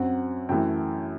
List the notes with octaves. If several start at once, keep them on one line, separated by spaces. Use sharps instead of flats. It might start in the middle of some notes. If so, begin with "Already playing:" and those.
Already playing: F#2 F#3 C4 F#5
F#2 E3 A3 G5